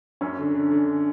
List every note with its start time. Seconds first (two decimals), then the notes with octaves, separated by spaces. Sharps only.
0.21 F#2 C#4
0.39 D3
0.55 D3
0.71 D3